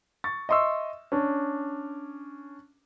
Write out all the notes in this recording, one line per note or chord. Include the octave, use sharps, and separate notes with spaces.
C#6 A6
D#5 E5 C6 C#6 E6
C#4 D4